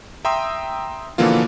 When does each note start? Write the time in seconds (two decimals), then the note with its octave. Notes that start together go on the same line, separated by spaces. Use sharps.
0.25 E5 G5 A#5 C6 D#6 E6
1.18 B2 D3 E3 F3 A#3 F4